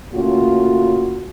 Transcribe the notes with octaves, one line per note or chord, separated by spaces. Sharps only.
A2 C#3 A#3 C#4 F4 F#4